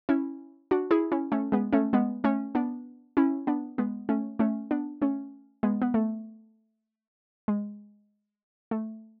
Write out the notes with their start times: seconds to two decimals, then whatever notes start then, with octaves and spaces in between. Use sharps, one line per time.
0.09 C#4 E4
0.71 D4 F#4
0.91 E4 G#4
1.12 C#4 E4
1.32 A3 C#4
1.52 G#3 B3
1.73 A3 C#4
1.93 G#3 B3
2.24 A3 C#4
2.55 B3 D4
3.17 C#4 E4
3.47 B3 D4
3.78 G#3 B3
4.09 A3 C#4
4.39 A3 C#4
4.71 B3 D4
5.02 A3 C#4
5.63 G#3 B3
5.82 B3
5.94 A3
7.48 G#3
8.71 A3